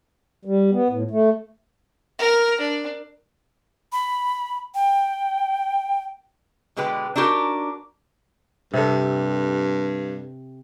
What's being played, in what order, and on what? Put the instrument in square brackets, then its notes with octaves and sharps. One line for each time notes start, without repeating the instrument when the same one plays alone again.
[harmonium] G3
B3
A2
A3
[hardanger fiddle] A#4
D4
[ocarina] B5
G5
[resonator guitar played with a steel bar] B2 D3 G#3 G4 B4 G5
D4 D#4 F#4 G4 A#4
[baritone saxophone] G2 [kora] C3 A4